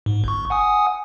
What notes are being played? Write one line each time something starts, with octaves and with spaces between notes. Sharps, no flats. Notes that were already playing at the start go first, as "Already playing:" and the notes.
G#2
G1 C#6
F#5 G#5 D#6